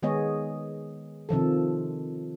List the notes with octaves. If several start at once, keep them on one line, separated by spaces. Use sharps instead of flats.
D#3 G#3 B3 G#4 C#5 D#5
C3 D#3 F3 A4